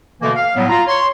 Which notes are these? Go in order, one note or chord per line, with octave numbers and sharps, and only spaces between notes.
B2 D3 E3 A3 A#3
F5
A2 F#3 G3 B3
F4 A#5
C#5 C6